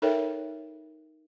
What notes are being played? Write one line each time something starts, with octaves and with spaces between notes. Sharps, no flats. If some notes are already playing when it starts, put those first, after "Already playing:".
D#4 A4 A#4 C#5 E5 G5